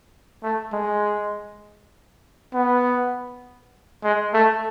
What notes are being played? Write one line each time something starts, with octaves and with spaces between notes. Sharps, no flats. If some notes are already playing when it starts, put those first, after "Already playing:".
A3
G#3
B3
G#3
A3